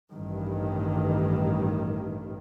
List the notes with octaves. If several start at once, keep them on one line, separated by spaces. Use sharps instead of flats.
A1 G2 D#3